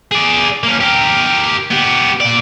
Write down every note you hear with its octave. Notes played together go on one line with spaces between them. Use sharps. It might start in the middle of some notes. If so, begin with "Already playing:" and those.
G#4 D5
A#3 C#4
G4 A#4
B3 G4
A#2 D5